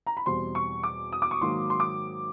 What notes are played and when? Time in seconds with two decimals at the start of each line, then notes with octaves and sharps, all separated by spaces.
0.07 A#5
0.17 B5
0.26 E2 B2 G3 C4 C6
0.55 C#6
0.83 D6
1.12 D#6
1.22 D6
1.31 C#6
1.41 G#2 D#3 F#3 A#3 C6
1.70 C6
1.80 D6